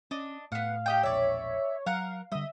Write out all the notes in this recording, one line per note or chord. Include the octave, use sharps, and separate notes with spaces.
C#4 D4 D#5
A2 B3 F5 F#5
G4 D#5 G5
E1 A#1 C#5 D5 E5
F#3 A#4 F5 F#5
D3 G3 D#5 E5